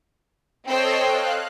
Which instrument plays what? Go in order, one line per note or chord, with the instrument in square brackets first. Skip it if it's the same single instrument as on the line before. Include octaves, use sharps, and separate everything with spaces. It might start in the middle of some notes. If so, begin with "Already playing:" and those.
[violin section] C4 C5 G5 [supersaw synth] A4 C#5 D#5
[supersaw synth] F5 F#6